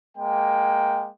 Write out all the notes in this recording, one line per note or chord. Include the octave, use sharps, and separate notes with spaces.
G#3 A#3 G5